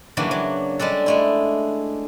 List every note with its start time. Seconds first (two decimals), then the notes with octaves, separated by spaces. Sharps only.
0.17 C#3 E3 F#3 G3 A#3 D4
0.31 F#3
0.79 G3 G#3 D4 A4
1.06 G#3 A3 E4